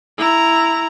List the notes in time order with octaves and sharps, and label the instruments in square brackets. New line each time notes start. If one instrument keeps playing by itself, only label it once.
[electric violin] E4 A#5